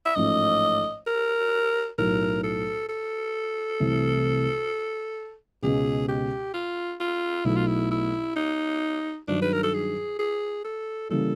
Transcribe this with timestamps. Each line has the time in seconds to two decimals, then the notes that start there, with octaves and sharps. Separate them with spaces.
0.05 E5
0.16 A1 G#2 F3 A3 D#5
1.07 A#4
1.98 B1 A2 F#3 A3 A#4
2.43 A4
2.89 A4
3.80 C2 C3 E3 A3
5.62 C#2 B2 G#3 C#4 G#4
6.08 G4
6.54 F4
7.00 F4
7.45 B1 B2 F#3 A3 E4
7.56 F4
7.67 E4
7.91 E4
8.36 D#4
9.28 G2 D#3 F#3 D4
9.42 B4
9.53 A#4
9.63 A4
9.74 G#4
10.19 G#4
10.64 A4
11.09 C#3 E3 G3 A#3 A4